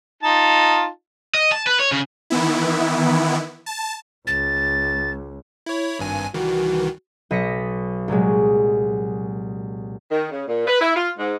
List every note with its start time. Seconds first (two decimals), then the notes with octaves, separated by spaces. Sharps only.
0.23 D#4 F4 A5
1.34 D#5
1.52 A5
1.67 B4
1.80 C#5
1.92 C#3
2.30 D#3 E3 B3 E4
3.66 A5
4.27 C#2 A6
5.66 E4 C#5
5.99 G#1 G2 G#5
6.34 C2 D#3 E3 F#4
7.31 B1 D#5 A#6 B6 C#7
8.08 C2 A#2 F#3 G#3
10.11 D#3
10.31 C#3
10.47 A#2
10.67 B4
10.80 E4
10.95 F4
11.18 G#2